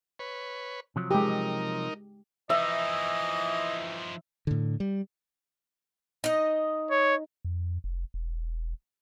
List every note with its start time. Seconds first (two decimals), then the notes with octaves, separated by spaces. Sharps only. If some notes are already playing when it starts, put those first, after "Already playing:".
0.19 B4 C#5
0.96 C3 F3 F#3
1.11 G#3 D#4 G4 A#4
2.50 E3 F3 D#4 D#5 E5
4.47 A2 D3
4.80 G3
6.24 D#4 D#5
6.91 C#5
7.45 F2
7.84 F1
8.14 E1